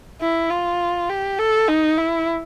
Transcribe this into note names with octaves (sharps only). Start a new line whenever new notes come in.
E4
F4
G4
A4
D#4
E4